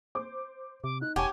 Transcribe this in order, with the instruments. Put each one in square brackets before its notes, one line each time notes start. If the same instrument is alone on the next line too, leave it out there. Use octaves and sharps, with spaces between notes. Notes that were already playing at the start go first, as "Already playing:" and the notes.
[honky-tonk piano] C5 D6
[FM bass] C3 [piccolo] D6
[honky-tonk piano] D#4 [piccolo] F#6
[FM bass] E1 [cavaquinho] G4 C#5 [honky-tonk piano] F#5 A5 [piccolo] G#5